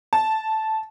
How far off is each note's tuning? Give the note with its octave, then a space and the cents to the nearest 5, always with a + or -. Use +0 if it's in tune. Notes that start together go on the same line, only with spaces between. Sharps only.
A5 -5